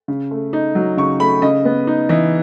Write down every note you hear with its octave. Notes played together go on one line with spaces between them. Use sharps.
C#3
A3
D#4
F#3
C#3 C#6
A3 B5
C#3 D#5
B3
D#4
E3 D#5